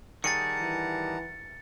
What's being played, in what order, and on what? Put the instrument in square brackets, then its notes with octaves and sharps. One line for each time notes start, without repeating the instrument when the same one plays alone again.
[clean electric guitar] D#3 G3 G#4 [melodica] F#5 A5 A#5 [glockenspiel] A6 C#7
[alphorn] E3